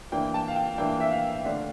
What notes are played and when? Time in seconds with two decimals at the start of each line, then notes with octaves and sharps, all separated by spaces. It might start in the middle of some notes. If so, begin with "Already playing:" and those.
0.12 E3 A#3 D4 G5
0.34 A5
0.48 F5
0.56 G5
0.78 E3 A#3 D4 G5
1.00 E5
1.11 F5
1.45 D3 A3 D4